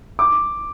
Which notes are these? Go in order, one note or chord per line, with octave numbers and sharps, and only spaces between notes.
D6